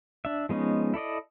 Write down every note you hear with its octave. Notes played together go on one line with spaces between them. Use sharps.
D4 E5
F3 G#3 B3 C#4 D#4
E4 A4 D5 D#5